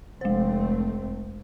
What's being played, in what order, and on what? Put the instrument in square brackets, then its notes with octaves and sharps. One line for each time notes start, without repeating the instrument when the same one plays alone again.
[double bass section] F1 A3 C4 [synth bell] G#3 C5